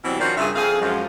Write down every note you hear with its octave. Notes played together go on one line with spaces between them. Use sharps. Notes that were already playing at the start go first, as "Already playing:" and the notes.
B2 E3 F#3 G3 C4
D#3 F3 C4 C#4 F#4 D5
G2 C#3 F4 G#4 E5
F2 G#4 F5
F#2 F3 G#3